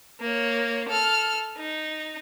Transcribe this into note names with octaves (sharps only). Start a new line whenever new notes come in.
A#3 C#5
A4 F6
D#4